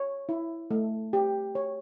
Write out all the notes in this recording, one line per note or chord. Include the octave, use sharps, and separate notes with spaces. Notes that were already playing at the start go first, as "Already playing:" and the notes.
Already playing: C#5
E4
A3
G4
C#5